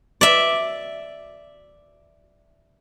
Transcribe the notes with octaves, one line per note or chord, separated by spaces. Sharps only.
D5 E5